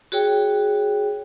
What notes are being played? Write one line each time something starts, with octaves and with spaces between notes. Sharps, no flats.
F#4 G#4 C#5 G5